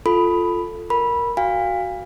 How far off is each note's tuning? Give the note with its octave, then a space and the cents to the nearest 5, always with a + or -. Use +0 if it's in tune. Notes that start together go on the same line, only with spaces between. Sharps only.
F4 +0 A4 +0 B5 +0
A#4 +0 B5 -15
F#4 +0 F5 +0 G#5 -45